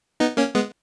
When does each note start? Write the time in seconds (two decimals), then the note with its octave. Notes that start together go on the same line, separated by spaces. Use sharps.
0.20 B3 D#4
0.37 A#3 C#4
0.55 G#3 B3